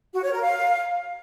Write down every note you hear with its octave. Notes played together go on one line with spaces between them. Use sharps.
F#4
C#5
A#4
F5